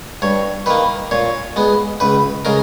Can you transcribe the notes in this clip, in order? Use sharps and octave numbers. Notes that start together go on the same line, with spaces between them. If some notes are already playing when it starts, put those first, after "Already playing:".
G2 C#5
D#3 A#3 B4
A#2 C#5
G#3 B3
C#2 B4
C#3 G#3 A#4